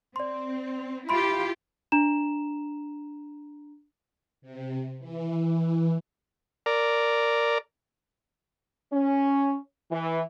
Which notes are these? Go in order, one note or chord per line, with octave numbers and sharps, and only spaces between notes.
C4 D5 C6
E4 F4 G4 B5 C6 D7
D4 A#5 E7
C3
E3
A#4 D5
C#4
E3